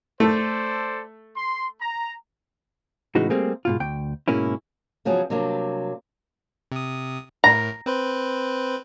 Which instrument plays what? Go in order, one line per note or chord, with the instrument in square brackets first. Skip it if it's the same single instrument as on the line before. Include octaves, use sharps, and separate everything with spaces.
[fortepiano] A3 [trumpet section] A4 C5 D5
[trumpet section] C6
A#5
[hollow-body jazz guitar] A2 C#3 E3 G#3 D#4 F#4
G3 A3 A#3 C4 G#4
G#2 B2 F4
D2 G5
G#2 B2 A#3 C#4 E4
[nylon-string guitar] C#3 F3 F#3 B3 G#4
C3 F#3 G3 A#3 D4
[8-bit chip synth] C3 D#6
[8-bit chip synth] A2 A#4 [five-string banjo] A#5
[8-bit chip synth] C4 B4 C5